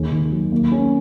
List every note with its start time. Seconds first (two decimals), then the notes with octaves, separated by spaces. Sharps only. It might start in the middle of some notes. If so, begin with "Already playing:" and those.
Already playing: D#2 G#4
0.11 D#3
0.32 F#3
0.52 A#3
0.72 C#4